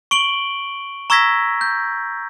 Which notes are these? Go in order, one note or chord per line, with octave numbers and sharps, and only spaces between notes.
C#6 D7 F#7 G7
A#5 C#6 E6 G#6 A#6 B6
G6